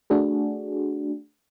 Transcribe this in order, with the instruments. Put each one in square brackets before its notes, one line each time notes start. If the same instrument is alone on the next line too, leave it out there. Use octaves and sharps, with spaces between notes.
[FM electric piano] A3 D4 F#4 G#4